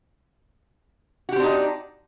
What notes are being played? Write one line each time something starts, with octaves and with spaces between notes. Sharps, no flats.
C4 D4 D#4 F#4 G4